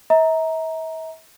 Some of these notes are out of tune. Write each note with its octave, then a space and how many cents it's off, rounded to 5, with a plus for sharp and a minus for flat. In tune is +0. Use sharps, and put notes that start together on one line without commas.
E5 -40 A#5 +0